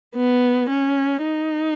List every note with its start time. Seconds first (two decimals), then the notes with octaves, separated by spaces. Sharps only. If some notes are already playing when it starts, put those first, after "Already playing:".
0.16 B3
0.70 C#4
1.24 D#4